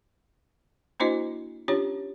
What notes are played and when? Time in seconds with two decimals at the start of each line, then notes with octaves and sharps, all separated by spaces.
1.00 A#3 D4 E4 F#4 C5 D#5
1.68 C#4 D4 F4 G4 C#5